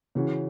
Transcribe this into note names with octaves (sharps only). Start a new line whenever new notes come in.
C#3 E3 C#4 F#4